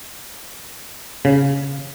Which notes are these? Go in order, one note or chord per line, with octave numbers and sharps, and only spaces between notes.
C#3